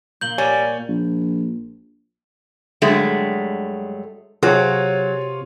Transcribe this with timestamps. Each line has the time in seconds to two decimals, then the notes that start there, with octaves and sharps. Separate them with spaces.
0.21 A#2 A#3 G6 F#7 G7
0.38 G3 C#5 G#5
0.88 A#1
2.82 G2 D3 F#3 G#3 A3
4.43 C3 F#3 F4 G#4 C#5